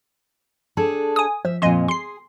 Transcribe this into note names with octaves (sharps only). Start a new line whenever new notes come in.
D4 G#4 A4
G#5 D#6
F3 E5
F2 A#2 D#5 G#5 C6
G#4 C6 C7